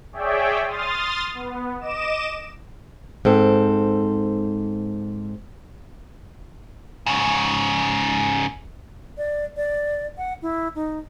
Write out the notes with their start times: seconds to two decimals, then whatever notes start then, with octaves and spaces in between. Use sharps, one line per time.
0.13 G#4 C#5 D5 E5 G5
0.65 C6 D#6 F6 A6
1.34 B3
1.80 D#5 D6 E7
3.25 G#2 C4 A4
7.06 G#2 C#3
9.18 D5
9.57 D5
10.18 F#5
10.42 E4
10.75 D#4